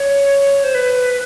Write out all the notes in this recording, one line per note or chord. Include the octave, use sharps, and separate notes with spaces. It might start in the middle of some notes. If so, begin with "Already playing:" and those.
Already playing: C#5
C5
B4